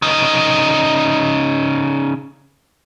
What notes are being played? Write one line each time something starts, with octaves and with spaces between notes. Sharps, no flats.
C#3 D#4